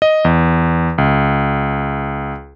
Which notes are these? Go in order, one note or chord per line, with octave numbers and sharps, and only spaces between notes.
D#5
E2
C#2